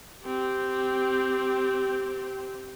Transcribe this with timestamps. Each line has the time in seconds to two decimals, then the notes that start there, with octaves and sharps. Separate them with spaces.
0.24 C4 G4